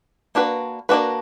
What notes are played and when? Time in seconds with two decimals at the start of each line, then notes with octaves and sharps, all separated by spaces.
0.35 A#3 D4 F#4 B4
0.89 A#3 D4 F#4 B4